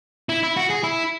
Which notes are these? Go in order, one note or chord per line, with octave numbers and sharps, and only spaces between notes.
E4
E4
F#4
G#4
E4